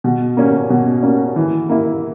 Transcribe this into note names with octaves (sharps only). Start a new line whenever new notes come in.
B2
A#3 C#4
B2
A#3 C#4
E3
A#3 E4